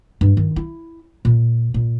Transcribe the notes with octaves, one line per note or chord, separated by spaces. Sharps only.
G2
D#3
E4
A#2
A#2